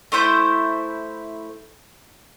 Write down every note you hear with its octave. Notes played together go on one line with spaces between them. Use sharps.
A3 E4 C5 G6